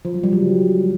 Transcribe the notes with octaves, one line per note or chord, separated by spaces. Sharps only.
F3
F#3
G3
F#3
C#3